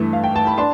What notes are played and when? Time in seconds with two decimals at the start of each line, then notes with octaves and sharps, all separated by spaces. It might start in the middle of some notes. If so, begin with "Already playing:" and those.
Already playing: G2 E3 A3
0.13 F5
0.24 G5
0.36 A5
0.47 B5
0.58 D4 A5 C6